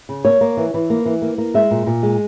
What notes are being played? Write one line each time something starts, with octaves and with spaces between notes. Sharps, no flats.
C#3
A#3 C#5
A#3
E3
E3
A#3
E3
A#3
A#3
G#3 E5
A#2
A#2
G#3